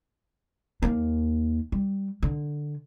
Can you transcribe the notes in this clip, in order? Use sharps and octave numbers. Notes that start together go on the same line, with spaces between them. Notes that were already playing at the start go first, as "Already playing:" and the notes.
D#2 A#3
G3
D3